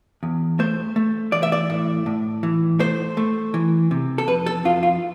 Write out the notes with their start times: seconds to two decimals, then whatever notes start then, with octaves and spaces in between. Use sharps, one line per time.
0.23 E2
0.59 A3 C5
0.96 A3
1.32 E3 D5
1.43 E5
1.52 D5
1.70 A2
2.06 A2
2.43 E3
2.80 A3 C5
3.17 A3
3.54 E3
3.91 C3
4.18 A4
4.28 F2 B4
4.46 A4
4.65 F2 F4
4.83 F4